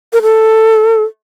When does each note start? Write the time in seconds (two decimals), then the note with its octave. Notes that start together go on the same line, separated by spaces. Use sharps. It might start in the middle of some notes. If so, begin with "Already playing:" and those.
0.13 A#4
0.22 A4